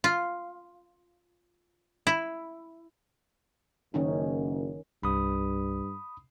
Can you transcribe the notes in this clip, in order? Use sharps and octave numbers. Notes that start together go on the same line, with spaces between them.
F4
E4
F#1 D#3 C#4 D#4
C2 G2 B5 D#6